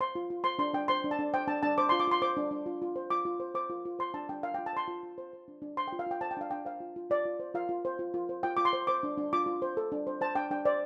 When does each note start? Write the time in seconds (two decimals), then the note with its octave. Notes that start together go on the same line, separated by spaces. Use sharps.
0.01 C5 C6
0.15 F4
0.30 F4
0.44 C5 C6
0.59 D4 C6
0.74 D4 G5
0.88 C5 C6
1.04 D4
1.11 A5
1.19 D4
1.34 C5 G5
1.47 D4 A5
1.63 D4 A5
1.78 C5 D6
1.89 C6
1.92 F4
2.00 D6
2.08 F4 C6
2.22 C5 D6
2.37 D4
2.51 D4
2.66 F4
2.82 F4
2.96 C5
3.10 F4 D6
3.25 F4
3.40 C5
3.55 C5 D6
3.70 F4
3.85 F4
3.99 C5 C6
4.14 D4 A5
4.29 D4 G5
4.43 F4 F5
4.54 G5
4.59 F4
4.66 A5
4.73 C5 C6
4.88 F4
5.03 F4
5.18 C5
5.33 C5
5.48 D4
5.62 D4
5.77 C5 C6
5.88 G5
5.92 F4
5.99 F5
6.06 F4 G5
6.21 C5 A5
6.31 G5
6.37 D4 F5
6.51 D4 G5
6.65 C5 F5
6.80 F4
6.96 F4
7.10 F4 D5
7.25 F4
7.40 C5
7.54 F4 F5
7.69 F4
7.85 C5
7.99 F4
8.14 F4
8.29 C5
8.43 F4 G5
8.57 F4 D6
8.65 C6
8.73 C5
8.87 C5 D6
9.03 D4
9.18 D4
9.33 F4 D6
9.46 F4
9.62 C5
9.77 A4
9.92 D4
10.07 C5
10.21 C5 A5
10.35 D4 G5
10.51 D4 G5
10.65 C5 D5